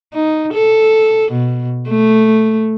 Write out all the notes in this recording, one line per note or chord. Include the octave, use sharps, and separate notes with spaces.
D#4
A4
B2
A3